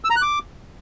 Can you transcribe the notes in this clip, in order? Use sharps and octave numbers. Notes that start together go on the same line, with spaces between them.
E6
A#5
F#6
D6